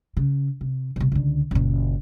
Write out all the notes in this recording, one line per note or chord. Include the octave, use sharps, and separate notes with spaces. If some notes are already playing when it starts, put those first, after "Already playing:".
C#3
C3
C2 B2
C#2 D3
F#1 A#2